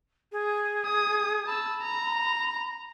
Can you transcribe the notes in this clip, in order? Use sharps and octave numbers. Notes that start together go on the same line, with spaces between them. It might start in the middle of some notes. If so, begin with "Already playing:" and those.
G#4
D#6
A5 B5 E6
A#5